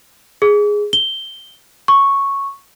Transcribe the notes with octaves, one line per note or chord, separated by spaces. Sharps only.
G#4
G7
C#6